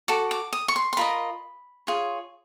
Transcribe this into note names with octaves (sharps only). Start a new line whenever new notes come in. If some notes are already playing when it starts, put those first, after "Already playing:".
F#4 A4 D6
D6
D#6
C#6
C6
C6
F4 A#4 D#5 B5
F4 G#4 C#5